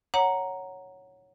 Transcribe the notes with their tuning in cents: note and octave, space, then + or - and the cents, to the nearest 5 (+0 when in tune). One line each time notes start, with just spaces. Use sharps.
C#5 +0 F#5 +0 A#5 +0